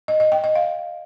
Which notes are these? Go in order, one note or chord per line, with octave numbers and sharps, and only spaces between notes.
D#5
D#5
G5
D#5
F5